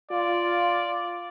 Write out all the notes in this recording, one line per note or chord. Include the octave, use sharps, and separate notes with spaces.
F4 D5